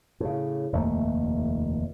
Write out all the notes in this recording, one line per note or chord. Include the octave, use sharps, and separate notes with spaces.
A2 C#3
F1 D#2 A#2 A3